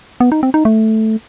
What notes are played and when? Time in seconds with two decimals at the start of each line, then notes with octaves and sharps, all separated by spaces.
0.20 B3
0.32 D#4
0.43 C4
0.54 D#4
0.65 A3